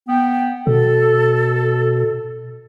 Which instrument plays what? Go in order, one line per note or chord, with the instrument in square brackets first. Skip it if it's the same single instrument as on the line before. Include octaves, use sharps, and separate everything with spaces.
[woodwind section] B3 G5
[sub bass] B2 [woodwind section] A4